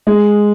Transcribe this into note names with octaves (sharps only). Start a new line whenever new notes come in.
G#3